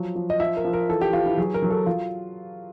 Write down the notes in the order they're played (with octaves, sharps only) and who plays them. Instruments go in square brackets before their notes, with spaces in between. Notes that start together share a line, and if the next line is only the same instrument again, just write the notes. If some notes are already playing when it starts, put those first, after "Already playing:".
Already playing: [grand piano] F3 F#3
F3
D#5
F3 E5
A#4
F3
A#4
E3 A4
G4
E3 F4
E4
F#3 G#4
A#4
F#3
A4
F#3 F4